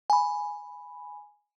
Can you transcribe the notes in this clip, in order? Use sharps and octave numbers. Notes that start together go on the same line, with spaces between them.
G#5 B5